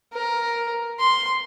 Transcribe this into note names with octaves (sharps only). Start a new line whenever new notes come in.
A#4
C6